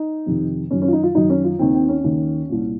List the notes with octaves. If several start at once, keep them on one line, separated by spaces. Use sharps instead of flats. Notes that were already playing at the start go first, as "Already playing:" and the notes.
Already playing: D#4
F2 C3 D#3
F#2 D#3 C#4
C#4
F4
D#4
F4
F#2 D#3 D#4
C#4
F4
D#2 D#3 C4
C4
C#4
D#2 D#3
C2 A#2